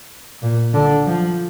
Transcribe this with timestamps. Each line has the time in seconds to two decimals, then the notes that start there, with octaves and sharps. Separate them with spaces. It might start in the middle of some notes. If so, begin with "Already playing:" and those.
0.42 A#2
0.74 D3
1.06 F3